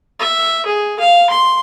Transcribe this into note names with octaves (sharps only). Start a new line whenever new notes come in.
E5
G#4
F5
C6